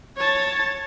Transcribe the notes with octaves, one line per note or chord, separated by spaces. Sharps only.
C#5 A5